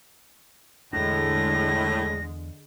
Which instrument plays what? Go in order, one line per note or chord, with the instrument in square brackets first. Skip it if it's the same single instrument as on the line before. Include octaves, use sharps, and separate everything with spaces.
[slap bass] E2 D4 [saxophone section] A2 [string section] D3 G#3 [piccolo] A#6